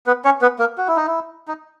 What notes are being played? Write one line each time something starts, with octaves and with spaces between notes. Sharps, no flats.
B3 B4
C#4 C#5
B3 B4
A#3 A#4
F#4
E4
D#4
E4
D#4